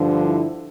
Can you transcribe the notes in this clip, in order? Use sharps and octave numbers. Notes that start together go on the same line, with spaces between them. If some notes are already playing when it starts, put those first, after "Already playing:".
Already playing: G2 D3 F3
E4